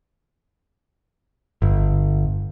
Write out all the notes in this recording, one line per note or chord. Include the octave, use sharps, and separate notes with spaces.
G1